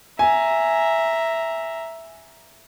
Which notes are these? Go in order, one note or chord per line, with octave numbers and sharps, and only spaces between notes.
E5 G#5 A#5